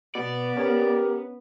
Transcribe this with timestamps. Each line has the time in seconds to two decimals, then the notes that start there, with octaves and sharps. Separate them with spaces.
0.15 B2 B3 D5
0.57 C#4 G4 A#4